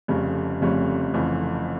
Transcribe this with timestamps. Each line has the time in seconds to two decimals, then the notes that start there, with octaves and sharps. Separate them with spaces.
0.08 F1 F2 C#3 G3 C#4
0.61 F1 F2 C#3 G3 C#4
1.14 F1 F2 C#3 E3